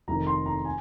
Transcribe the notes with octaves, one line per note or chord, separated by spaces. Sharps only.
F1 F2 D#3 A#5
C6
A#5
G#5